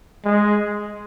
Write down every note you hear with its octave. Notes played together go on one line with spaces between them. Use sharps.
G#3